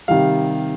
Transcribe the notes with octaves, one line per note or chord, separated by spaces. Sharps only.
C3 D#3 G3 F5